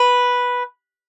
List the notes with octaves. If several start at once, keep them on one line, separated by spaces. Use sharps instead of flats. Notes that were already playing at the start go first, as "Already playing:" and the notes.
Already playing: B4